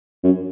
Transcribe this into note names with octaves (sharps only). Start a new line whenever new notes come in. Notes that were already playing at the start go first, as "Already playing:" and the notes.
F#2